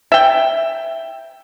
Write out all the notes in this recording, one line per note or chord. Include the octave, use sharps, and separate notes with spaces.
E5 G5